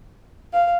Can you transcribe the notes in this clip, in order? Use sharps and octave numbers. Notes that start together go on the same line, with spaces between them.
F5